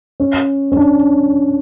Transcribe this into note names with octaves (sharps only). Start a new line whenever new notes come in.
C#4
C#4
D4